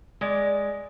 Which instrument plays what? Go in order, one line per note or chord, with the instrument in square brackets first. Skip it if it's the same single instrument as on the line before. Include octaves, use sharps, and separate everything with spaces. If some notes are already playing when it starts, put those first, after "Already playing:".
[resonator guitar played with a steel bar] G#3 D5